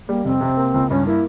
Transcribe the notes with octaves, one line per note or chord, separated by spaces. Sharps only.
G3 A#3
F1 C4
C3
A#3
C#2
G2 C#4
A#3 E4